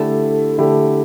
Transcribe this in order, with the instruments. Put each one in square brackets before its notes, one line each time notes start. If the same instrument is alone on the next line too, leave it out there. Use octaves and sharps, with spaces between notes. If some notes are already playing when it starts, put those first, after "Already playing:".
Already playing: [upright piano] D3 A3 E4 G4 [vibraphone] A4
[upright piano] D3 A3 E4 G4